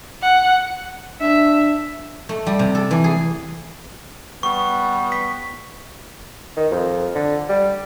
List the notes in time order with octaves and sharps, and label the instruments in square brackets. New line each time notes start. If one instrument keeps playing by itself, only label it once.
[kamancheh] F#5
[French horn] D4 [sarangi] E5
[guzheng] A3
G3
C3
A4
E3
G#4
[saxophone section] G3 B3 [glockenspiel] C#6
[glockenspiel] B6
[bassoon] D#3
F2
D3
G3